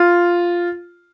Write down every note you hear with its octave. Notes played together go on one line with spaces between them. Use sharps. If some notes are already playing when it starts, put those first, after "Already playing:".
Already playing: F4